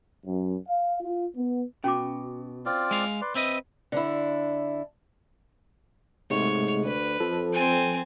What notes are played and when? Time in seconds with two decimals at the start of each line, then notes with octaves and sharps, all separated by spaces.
0.24 F#2
0.66 F5
1.00 F4
1.36 B3
1.84 B2 C#4 F#4 D6
2.66 C4 F4 D5
2.91 G#3 F5
3.21 B4 D5 C6
3.35 C4 B4 D#5 E5
3.92 D3 D4 E4
6.30 G#2 C3 G#3 A3 C#5
6.84 D2 B4
7.20 F2 F3 A4
7.53 C4 G#5